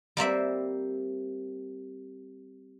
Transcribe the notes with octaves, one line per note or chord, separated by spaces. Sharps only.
G3 A#3 C4 E5